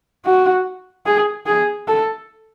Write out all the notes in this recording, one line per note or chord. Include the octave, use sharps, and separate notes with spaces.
F#4
G#4
G#4
A4